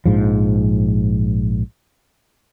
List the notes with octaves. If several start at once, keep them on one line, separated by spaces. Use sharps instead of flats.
A#1 G#2 F3